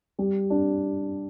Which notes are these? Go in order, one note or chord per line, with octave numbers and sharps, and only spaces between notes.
G3
D4